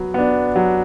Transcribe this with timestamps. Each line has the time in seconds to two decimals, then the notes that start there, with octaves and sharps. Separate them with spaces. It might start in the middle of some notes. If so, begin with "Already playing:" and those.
Already playing: F#3 B3
0.14 B3 D4
0.56 F#3